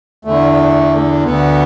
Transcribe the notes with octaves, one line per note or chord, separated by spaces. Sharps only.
E2 D3 A3
D2 D3 B3